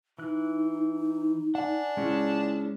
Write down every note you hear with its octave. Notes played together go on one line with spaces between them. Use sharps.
E3 D#4 F#6
D4 F#5 G#5
G#3 C#4 E4